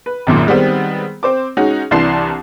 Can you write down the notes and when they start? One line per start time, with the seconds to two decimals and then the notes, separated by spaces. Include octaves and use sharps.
0.06 B4
0.27 G#1 F#2 A#2
0.47 D#3 G3 G#3 B3 C4
1.23 C4 C5 D6
1.57 G#3 C#4 D#4 F#4
1.91 C2 E3 D4 A5 C6 C7